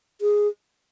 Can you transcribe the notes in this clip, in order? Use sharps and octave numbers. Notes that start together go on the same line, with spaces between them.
G#4